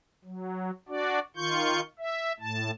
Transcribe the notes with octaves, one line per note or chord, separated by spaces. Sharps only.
F#3
D4 F#4 D5
D#3 F4 C#6 G6
E5
A2 A5